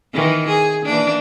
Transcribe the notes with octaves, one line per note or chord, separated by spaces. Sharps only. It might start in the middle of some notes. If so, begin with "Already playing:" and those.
D#3 E3
G#4
E3 A#3 D4